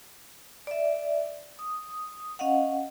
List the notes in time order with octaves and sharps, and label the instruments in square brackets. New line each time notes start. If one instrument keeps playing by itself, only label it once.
[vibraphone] D5 E5
D#6
C#4 D#5 F5 F#5